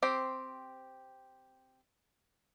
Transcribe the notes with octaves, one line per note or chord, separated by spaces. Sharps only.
C4 G4 C5